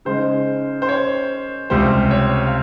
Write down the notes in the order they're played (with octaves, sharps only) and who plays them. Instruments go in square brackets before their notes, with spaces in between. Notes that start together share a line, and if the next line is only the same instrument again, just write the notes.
[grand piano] C#3 G#3 D#4 C5
C5
C#5
C#2 C3 G3 C5
C#5
F5